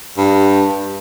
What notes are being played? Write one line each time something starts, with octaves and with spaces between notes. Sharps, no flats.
G2